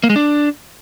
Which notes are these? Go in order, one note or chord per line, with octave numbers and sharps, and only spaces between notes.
A#3
G#3
D4